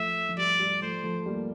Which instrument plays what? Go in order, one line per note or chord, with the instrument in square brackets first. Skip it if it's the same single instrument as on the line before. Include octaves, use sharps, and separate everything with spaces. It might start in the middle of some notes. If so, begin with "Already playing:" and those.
Already playing: [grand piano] F3 A3 [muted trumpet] E5
[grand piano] F3
[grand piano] G3 [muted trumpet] D5
[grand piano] G3
[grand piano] F3 A3 [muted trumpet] C5
[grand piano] F3 A3
G3 A#3